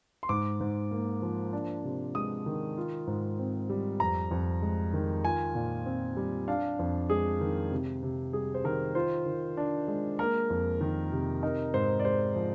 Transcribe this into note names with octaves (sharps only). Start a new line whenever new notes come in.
C6
G#2 D6
G#2
A#3
F3
D4
C3
G#3 D#6
D#3
F4
G#2
C4
G3
F2 A#5
F2
G#3
D#3
F4 G#5
A#2
C4
G3
D4 F5
F2
G#3 G#4
D#3
C3
C3
G3 G#4
C5
D#3 A#4
F4 C5
D#3
D4
G#3
A#3 A#4
F2
D#3
C3
D#4 A#4
G#2 C5
D5
G#3 C5
F3